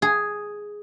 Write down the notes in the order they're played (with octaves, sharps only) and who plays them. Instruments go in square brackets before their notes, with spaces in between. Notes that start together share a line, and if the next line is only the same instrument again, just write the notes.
[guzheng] G#4